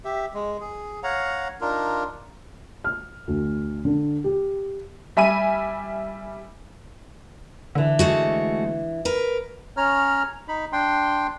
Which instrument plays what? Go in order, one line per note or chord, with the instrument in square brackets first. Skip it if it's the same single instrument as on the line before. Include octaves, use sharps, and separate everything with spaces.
[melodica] G4 E5
G#3
G#4
C#5 F5 F#5 A#5
D4 D#4 F4 A#4
[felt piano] F6
D2
D3
G4
[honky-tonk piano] G3 E5 G#5 B5 D#7
[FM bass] D3 [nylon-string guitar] E3 D4
[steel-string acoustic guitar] G#3 A3 F#4
A#4 B4
[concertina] C#4 C#5 A#5 F6
D#4 B5
D4 G5 C6